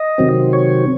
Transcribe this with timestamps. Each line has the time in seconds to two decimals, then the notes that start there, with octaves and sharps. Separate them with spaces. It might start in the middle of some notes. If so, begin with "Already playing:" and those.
Already playing: D#5
0.18 C3 D#3 F#3 C4
0.53 C#5